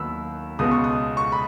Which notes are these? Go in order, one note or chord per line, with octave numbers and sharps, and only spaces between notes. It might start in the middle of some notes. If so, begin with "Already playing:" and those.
Already playing: D#2 D#3 F#3 B3 B5 E6
C#2 B2 G#3 B3 D#6
C#6
D#6
C#6
B5